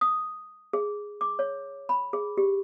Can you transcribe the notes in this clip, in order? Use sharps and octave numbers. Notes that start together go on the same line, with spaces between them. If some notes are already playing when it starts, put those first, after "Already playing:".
D#6
G#4
D6
C#5
B5
G#4
G4